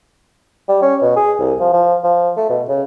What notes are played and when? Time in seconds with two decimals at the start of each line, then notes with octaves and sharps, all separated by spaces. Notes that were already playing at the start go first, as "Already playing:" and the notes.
0.68 G3
0.82 C#4
1.02 B2
1.16 G#4
1.39 C2
1.60 F3
1.73 F3
2.04 F3
2.37 A3
2.50 B2
2.69 C#3